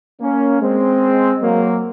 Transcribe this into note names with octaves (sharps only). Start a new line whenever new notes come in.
A#3 C#4
G#3 C4
F#3 A#3